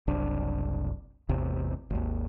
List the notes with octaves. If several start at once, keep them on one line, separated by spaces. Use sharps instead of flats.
F#1 C2 D4
A1 E2 C3
G#1 D#2